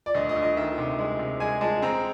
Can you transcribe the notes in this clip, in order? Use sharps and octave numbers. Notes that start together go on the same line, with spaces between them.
D5
D2 D#5
D#5
D2
D#5
D#3 E5
C3
G#3
C3
G#3 G#5
G#3 A5
C4 A#5